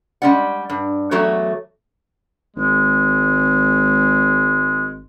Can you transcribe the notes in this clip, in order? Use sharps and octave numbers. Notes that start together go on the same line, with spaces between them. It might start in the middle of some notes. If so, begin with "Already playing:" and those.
G3 G#3 C#4 D5 F#5
G2
E2 F#3 A3 F#4 C#5
G#1 G#3